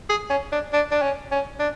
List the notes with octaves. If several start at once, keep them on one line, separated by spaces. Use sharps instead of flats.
G#4
C#4
D4
D4
D4
C#4
C#4
D4